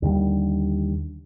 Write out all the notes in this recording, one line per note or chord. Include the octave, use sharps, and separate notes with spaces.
D#2 D3 G3